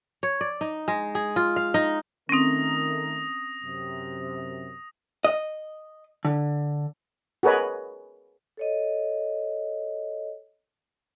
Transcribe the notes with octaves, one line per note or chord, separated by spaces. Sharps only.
C#5
D5
D#4
G#3
G#4
F4
F5
D#4
D#3 A3 C4 C#4 A#4 D#6 A#6
F#2 C3
D#5
D3
F#4 G#4 A#4 B4 C#5 D#5
A4 C#5 D#5